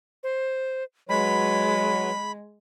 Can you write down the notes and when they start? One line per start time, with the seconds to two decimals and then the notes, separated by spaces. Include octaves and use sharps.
0.23 C5
1.09 F#3 G#3 B4 C#5 B5